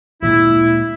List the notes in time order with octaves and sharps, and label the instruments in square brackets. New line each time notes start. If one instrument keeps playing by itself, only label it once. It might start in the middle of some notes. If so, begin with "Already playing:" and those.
[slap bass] D2 A#2 G#3 [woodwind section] E4